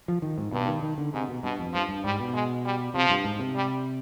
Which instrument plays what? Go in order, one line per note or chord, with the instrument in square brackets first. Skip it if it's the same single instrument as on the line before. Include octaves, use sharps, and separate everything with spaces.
[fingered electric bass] F3
D#3
G#2
[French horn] G2 [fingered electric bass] B2
[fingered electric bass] D#3
D#3
D3
[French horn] G#2 [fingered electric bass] C3
[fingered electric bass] B2
[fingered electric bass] G2 [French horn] B2
[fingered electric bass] F2
[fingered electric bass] G2 [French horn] F3
[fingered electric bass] G2
[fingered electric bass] G#2 [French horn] G3
[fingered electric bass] B2
[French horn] G#3
G3
[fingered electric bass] C3 [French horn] F3
[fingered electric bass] G2
G#2
C3
[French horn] G3